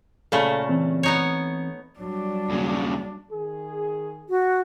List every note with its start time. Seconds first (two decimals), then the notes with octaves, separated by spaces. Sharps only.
0.32 A#2 C#3 A3 A4 F5 B5
0.69 E3 C4
1.03 B3 D#4 C#5
2.00 F#3 G3 D4
2.50 D#2 C#3
3.32 D#3 G#4
4.29 F#4